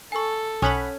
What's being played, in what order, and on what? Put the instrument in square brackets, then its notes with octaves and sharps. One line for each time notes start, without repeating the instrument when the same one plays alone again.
[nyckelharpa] A4 [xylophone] G#5 C#6
[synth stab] B1 F#5 B5 [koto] C#4 [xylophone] C#6 D#6